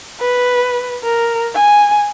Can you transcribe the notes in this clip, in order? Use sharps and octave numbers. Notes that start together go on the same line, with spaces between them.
B4
A#4
G#5